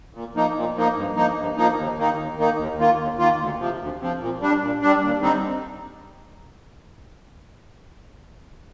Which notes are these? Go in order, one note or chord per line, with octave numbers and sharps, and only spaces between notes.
A#2
F3 A#3 D#4
A#2
F3 A#3 D#4
G2
F3 A#3 D#4
G2
F3 A#3 D#4
D#2
D#3 A#3 D#4
D#2
D#3 A#3 D#4
D#2
D#3 A#3 F4
D#2
D#3 A#3 F4
D2
C3 F3
D2
C3 F3
A#2
G3 D4
A#2
G3 D4
D#2
D3 G3 C4 D#4